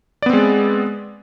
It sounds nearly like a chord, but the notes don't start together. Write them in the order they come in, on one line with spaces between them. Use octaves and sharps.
D5 B3 C4 G#3